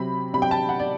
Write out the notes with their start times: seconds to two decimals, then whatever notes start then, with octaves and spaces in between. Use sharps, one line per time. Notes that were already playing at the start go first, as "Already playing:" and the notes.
Already playing: C3 F#3 C4 B5
0.33 C3 F#3 C4 B5
0.42 G5
0.51 A5
0.69 F#5
0.79 D5